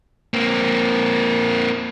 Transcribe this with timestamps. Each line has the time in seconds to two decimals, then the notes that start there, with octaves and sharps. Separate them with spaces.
0.34 A#3 C4